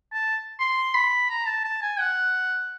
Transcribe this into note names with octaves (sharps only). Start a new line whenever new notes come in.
A5
C6
B5
A#5
A5
A5
G#5
F#5